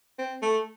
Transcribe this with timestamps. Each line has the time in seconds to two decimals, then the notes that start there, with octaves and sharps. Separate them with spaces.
0.19 C4
0.42 A3